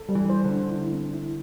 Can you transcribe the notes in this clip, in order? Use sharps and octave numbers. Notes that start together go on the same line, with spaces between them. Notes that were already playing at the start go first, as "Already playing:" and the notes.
Already playing: A4
G3
E3
C5
D3
D4
E4
C4
E4